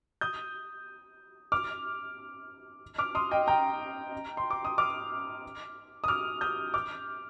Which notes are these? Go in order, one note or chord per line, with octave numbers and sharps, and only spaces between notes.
D#6 G6
D6 F6
D6 F6
C6 D#6
D#5 G5
G5 A#5
C6
D6
D#6
D6 F6
D#6
D6 F6
D#6 G6
D6 F6